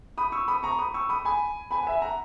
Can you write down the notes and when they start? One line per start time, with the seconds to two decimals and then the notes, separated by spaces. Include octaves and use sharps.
0.18 B5 D#6
0.32 C#6 E6
0.48 B5 D#6
0.63 A#5 C#6
0.79 B5 D#6
0.94 C#6 E6
1.09 B5 D#6
1.25 G#5 B5
1.71 G#5 B5
1.83 F#5
1.87 E5 G#5
2.02 F#5 A#5